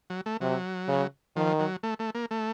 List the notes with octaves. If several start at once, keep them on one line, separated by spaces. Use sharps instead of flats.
F#3
A3
C3 F#3
C#3
D#3 F3
F#3
A3
A3
A#3
A3